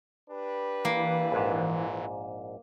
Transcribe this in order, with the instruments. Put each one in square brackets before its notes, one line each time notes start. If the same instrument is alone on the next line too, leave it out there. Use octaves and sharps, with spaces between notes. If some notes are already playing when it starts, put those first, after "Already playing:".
[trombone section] D4 G4 B4
[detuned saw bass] E3 [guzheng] A#3
[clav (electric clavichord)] A#1 G#2